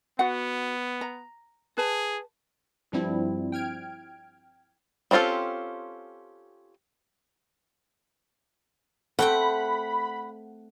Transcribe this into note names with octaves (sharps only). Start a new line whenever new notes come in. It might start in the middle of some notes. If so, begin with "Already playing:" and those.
B3 F#4 F#5
A#5
G#4 B4 A5
G2 F3 G3 C4 E4
G5 F6 G#6 D7
C4 C#4 F4 G4 A4
A3 C4 F#5 G5 B5